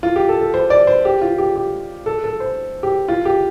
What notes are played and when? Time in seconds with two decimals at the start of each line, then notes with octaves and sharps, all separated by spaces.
0.03 F4
0.16 G4
0.29 A4
0.41 A4
0.54 C5
0.70 D5
0.87 C5
1.05 G4
1.21 F4
1.38 G4
1.56 G4
2.06 A4
2.24 A4
2.40 C5
2.83 G4
3.08 F4
3.25 G4